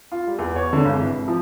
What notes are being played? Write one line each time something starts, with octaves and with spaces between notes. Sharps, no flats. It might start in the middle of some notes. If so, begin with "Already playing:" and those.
F4
G3
E2
C#5
D3
G#1
E3
C3
F3